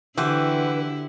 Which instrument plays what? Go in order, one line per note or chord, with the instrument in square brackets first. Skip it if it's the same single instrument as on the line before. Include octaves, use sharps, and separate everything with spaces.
[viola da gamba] D3 E4 [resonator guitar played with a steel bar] E3 [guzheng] F#4 G4 C5 [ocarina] B4